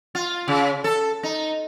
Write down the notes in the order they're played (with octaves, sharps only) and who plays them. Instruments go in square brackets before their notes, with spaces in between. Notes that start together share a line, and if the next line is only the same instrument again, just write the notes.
[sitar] F4
C#3
A4
D#4